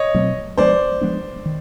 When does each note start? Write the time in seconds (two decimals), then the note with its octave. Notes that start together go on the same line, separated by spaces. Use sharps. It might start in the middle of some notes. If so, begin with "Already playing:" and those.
Already playing: C#5 D#5
0.14 B2 F#3 A3 C4
0.57 F3 G#3 B3 D4 C5 D5
1.01 F3 G#3 B3 D4
1.46 D#3